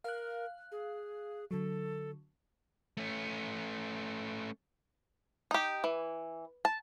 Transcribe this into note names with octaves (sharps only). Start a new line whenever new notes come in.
A#4 F5 F#6
G#4
D3 F#3 A4
A3 C#4
D#4 G4
E3
A5